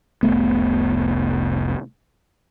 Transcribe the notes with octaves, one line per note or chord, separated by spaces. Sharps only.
F1 C2 A3 B3